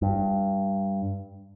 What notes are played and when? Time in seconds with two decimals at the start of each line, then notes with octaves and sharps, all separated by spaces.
0.02 G2